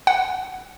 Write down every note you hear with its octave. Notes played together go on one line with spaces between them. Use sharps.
F#5